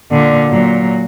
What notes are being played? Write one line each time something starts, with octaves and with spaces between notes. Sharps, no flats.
A#2 D3
A#2 F#3